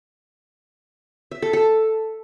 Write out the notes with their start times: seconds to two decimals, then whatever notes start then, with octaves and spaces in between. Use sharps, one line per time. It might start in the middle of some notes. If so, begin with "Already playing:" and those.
1.31 E5
1.42 A4
1.53 A4